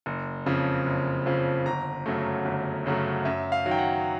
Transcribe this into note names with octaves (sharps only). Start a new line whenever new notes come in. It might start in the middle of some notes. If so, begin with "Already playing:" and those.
F#1
F2 C#3 F3
F#1
F2 C#3 F3
G1 A#5
F#2 C#3 F#3 A3
G1
F#2 C#3 F#3 A3
F#2 E5
F5
D#3 F#3
G5
F#5